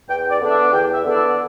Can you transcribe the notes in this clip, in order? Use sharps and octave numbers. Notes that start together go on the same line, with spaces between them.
E2 G5
D5
D3 B3 D4
E5
E2 G5
E5
D3 B3 D4
E4